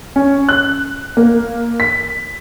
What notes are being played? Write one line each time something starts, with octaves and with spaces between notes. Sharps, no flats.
C#4
F#6
A#3
B6